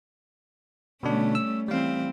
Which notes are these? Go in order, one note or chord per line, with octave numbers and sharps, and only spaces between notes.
B2 D3 G3 A3 C#4 D4
E6
E3 G3 C4 F5